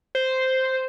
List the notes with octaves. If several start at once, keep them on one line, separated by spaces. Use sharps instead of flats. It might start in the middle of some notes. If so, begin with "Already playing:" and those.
C5